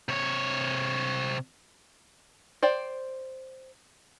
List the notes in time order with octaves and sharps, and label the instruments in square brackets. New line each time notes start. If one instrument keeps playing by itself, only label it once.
[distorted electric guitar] C3 C#5
[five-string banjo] C5 D5 G5